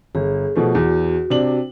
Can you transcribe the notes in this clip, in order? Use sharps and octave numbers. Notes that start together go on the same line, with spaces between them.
G1 G#4
B2 F3 A3
E2 F#4
C3 D4 F#7